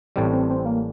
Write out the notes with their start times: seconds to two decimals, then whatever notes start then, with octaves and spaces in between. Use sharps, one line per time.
0.16 A1 A2 G3 C4
0.33 C4
0.50 C4
0.65 A#3